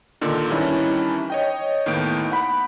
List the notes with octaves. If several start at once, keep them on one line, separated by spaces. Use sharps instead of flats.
A#2 D3 D#3
D#3 E3 G3 C#4 D4 E4
C#5 D#5 G5
D#2 A2 D#3 B3 G6 D7
F#5 B5